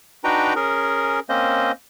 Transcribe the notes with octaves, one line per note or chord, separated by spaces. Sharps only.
D4 D#4 F#4 B4 G5 A#5
C#4 G#4 A#4
A#3 C4 C#4 C5 D#5